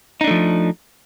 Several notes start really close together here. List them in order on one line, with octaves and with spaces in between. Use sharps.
D#4 D4 A3 F3